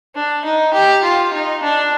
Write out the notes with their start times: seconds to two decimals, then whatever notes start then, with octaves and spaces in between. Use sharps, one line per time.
0.15 D4
0.45 D#4
0.74 G4
1.03 F4
1.33 D#4
1.63 D4